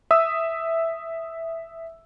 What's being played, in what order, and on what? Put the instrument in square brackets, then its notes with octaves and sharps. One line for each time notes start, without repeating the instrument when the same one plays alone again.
[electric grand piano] E5 D#6 E6